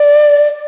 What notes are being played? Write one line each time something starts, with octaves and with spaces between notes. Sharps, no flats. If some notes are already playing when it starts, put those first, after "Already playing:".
Already playing: D5